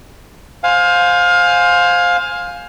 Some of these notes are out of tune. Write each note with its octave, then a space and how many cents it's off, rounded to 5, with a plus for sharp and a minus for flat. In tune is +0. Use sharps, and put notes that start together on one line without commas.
C5 +0 F5 +20 G#5 +0